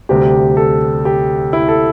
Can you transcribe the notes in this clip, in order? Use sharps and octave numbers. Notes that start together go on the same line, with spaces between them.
D2 C3 G3 G4
A4
G4
E4
A4